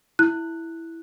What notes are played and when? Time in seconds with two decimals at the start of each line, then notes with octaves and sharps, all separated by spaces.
0.19 E4 F#6